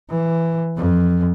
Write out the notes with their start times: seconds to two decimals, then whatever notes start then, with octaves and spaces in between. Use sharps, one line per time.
0.10 E3
0.77 F2